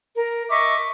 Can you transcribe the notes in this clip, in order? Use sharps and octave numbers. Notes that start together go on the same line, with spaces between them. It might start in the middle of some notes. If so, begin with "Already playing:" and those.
A#4
D#5 E5 C#6 D6